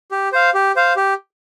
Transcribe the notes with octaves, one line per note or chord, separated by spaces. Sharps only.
G4
C5 F5
G4
C5 F5
G4